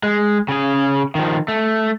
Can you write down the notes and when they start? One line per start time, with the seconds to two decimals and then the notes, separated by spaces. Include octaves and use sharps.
0.03 G#3
0.49 C#3 G#4
1.15 D#3 F3
1.48 A3